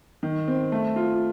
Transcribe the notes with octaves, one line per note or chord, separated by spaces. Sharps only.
D#3
C4
A3
F4